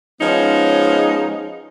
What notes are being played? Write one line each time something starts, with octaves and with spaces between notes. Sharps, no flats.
F3 G#3 B3 C#4 D#4